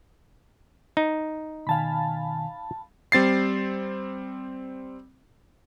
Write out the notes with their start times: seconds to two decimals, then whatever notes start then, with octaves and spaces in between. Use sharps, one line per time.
0.97 D#4
1.67 B2 D#3 F5 G#5 A5 B5
3.12 G3 C4 A6 C7